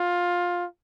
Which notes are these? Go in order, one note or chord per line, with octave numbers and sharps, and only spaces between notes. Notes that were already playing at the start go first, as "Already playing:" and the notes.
Already playing: F4